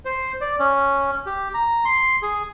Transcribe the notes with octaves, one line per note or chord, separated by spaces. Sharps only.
C5
D5
C#4
G4
A#5
C6
G#4